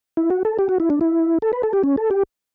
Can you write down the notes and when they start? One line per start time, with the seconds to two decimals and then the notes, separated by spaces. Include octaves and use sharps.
0.17 E4
0.30 F#4
0.45 A4
0.59 G4
0.69 F#4
0.80 E4
0.90 D4
1.01 E4
1.42 A4
1.53 B4
1.63 A4
1.73 G4
1.84 C#4
1.97 A4
2.11 G4